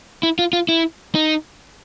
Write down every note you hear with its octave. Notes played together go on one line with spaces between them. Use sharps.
E4
F4
F4
E4
D#4